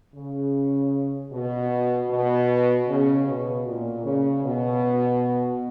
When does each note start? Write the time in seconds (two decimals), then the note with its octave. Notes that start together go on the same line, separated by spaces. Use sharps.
0.15 C#3
1.31 B2
2.10 B2
2.88 C#3
3.27 B2
3.66 A#2
4.04 C#3
4.44 B2